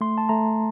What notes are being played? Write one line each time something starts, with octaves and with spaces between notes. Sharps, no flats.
A3 C6
A5
A3 A#5